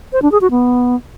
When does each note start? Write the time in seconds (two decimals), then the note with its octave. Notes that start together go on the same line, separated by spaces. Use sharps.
0.13 C5
0.22 D4
0.32 G#4
0.41 F#4
0.51 B3